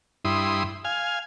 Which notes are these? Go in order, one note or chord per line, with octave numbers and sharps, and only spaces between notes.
G2 E4 C6 D#6
F5 G#5